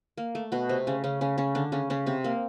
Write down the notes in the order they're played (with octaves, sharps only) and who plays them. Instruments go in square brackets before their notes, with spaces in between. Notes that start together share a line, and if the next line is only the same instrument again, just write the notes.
[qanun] A#3
A3
B2 B3
C3 C4
C#3 C#4
C#3 C#4
C#3 C#4
C#3 C#4
D3 D4
C#3 C#4
C#3 C#4
C3 C4
A#3